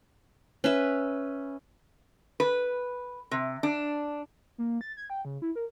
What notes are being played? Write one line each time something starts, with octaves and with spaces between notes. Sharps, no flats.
C#4 B4 E5
B4
C3
D4
A#3
A6
G#6
G5
C#3
E4
A#4